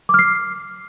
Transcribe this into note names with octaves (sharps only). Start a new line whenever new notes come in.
D6 F6 C7